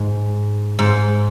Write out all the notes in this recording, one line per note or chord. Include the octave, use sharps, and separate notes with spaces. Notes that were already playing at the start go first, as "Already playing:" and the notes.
Already playing: G#2
G#2